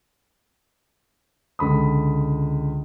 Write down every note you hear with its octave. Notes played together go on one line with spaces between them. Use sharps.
C#2 D3 B5 D#6